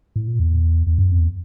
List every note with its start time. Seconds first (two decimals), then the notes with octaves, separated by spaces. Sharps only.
0.16 A2
0.28 A#2
0.40 E2
0.87 E2
0.98 F#2
1.11 F2
1.19 E2